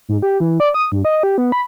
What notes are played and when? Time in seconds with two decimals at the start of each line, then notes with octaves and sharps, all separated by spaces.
0.09 G#2
0.22 G4
0.40 E3
0.60 D5
0.74 D#6
0.92 G2
1.05 D#5
1.23 G4
1.38 B3
1.52 B5